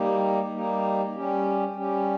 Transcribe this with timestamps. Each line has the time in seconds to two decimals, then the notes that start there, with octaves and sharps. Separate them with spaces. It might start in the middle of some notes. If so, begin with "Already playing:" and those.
Already playing: G3 A#3 D#4 G4
0.52 G3 A#3 D#4 G4
1.14 G3 C#4 G4
1.76 G3 C#4 G4